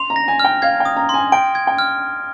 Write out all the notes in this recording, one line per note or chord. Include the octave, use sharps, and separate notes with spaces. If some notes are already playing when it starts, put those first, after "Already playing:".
Already playing: C6 F7
A#5
A#6
G#5
G5 F6
F5 G#6
G5
D#6
A#5
C6
G#5
G5 D7
G#6
G5
F6